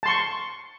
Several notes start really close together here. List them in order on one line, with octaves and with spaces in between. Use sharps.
A5 C6 C#6